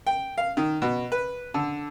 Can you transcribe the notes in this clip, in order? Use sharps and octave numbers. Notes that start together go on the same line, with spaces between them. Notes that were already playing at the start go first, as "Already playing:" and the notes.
G5
F5
D#3
B2
B4
D3